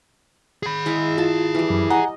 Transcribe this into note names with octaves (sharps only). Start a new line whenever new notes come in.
G#4 B5
G#3 E4 F5
F4 A5
E3 G3
F#2
D#5 F#5 G#5 A#5